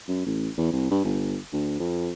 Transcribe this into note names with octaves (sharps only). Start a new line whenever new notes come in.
F#2
A1
E2
C2
G2
G1
D2
F2